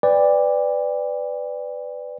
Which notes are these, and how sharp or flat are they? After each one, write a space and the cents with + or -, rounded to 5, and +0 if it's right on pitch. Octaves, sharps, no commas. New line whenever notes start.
B4 +15 D5 +0 G5 +35